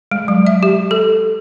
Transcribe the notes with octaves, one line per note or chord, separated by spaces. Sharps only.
G#3
F#3
E5
G4
A4